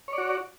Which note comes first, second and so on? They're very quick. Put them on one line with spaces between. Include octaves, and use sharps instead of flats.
C#5 D5 F#4